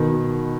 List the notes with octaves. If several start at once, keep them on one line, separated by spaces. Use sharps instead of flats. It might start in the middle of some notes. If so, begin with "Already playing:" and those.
Already playing: B2 D#3